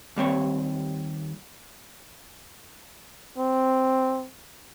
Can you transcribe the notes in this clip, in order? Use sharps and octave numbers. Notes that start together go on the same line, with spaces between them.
D#2 G3 C4 C#5
C4